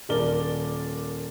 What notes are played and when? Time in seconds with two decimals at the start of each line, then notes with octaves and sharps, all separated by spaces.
0.09 D#1 A#4 D5 G7